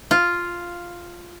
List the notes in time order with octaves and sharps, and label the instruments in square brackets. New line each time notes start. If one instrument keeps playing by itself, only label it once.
[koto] F4